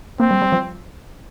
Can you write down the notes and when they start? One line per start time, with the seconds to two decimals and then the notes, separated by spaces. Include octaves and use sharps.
0.20 A#3 C4
0.31 G3
0.42 G3
0.52 F3